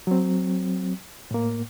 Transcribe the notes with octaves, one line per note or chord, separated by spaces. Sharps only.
F#3 C4
A2 A#3